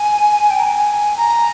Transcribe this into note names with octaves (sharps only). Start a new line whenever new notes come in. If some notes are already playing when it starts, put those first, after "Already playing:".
Already playing: G#5
G5
A#5
G#5
A#5